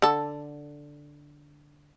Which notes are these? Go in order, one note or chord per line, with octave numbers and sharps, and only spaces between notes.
D3 A4